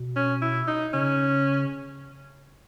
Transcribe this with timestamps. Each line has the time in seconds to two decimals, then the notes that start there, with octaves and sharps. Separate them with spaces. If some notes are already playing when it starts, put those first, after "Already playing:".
Already playing: B2
0.16 C#4
0.42 E4
0.67 D#4
0.93 C#3 C#4